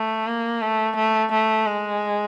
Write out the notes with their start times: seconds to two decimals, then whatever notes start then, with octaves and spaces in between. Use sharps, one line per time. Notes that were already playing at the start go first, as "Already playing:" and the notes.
Already playing: A3
0.27 A#3
0.62 A3
0.96 A3
1.32 A3
1.66 G#3